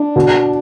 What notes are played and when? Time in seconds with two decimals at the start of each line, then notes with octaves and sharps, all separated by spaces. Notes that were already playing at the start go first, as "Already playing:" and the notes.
Already playing: D4
0.16 B2